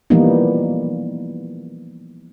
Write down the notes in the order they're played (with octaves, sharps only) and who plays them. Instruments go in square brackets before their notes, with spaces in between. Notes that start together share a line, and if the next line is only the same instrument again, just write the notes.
[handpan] E3 F3 G3 A#3 B3 D#4